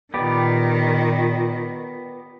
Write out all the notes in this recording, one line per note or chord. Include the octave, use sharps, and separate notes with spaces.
A#2 D#3 B3 G4 D5